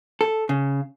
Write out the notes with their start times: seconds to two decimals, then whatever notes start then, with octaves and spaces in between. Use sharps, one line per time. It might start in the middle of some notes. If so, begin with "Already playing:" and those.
0.21 A4
0.49 C#3